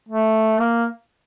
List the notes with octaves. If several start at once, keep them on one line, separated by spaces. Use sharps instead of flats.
A3
A#3